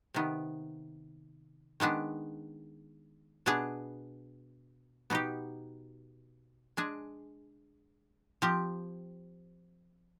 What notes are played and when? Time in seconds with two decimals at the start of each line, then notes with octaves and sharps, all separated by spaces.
0.14 C3 D#3 B3
1.80 D#3 G#3 B3 D4
3.46 B2 B3 D4 G#4
5.10 B2 B3 D#4 G4
6.77 G#3 D4 G#4
8.42 F3 C4 G4